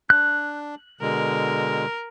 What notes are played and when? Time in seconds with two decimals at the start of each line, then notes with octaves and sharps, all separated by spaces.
0.10 D4 F#6
1.01 B2 D3 G#3 A#4